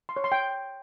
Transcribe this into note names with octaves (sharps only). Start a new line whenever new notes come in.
C6
C#5
C6
G5